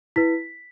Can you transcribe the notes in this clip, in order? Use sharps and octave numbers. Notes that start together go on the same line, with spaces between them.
E4 B4 B6